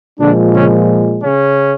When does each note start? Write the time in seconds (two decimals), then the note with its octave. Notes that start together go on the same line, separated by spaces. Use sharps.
0.19 A#2 D3 F3 G#3 D4
0.55 C#3 C#4
1.23 C#3 C#4